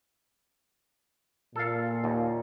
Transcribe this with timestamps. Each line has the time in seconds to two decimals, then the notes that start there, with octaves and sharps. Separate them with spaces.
1.56 A#2 A4 F5
2.04 D#2